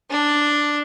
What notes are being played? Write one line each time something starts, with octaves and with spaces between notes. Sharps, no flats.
D4